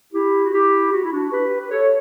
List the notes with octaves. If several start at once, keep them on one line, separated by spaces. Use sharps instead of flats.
E4 G4
F#4
E4 G4
F#4
E4
D4 F#4
G4 B4
B4
A4 C#5